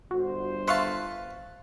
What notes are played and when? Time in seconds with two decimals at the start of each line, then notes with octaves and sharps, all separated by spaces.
0.11 G1 F#4 C5
0.68 B4 E5 F5 A5 C6 C#6